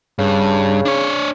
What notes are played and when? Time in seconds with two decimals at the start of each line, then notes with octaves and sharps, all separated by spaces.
0.19 G2 C#3
0.85 D4 C#5